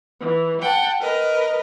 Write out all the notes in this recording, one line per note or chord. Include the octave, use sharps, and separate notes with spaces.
E3
F#5 G5 A5
A#4 B4 D#5